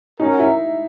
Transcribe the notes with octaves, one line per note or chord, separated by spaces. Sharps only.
C#4 D#4 F#4 A#4
E4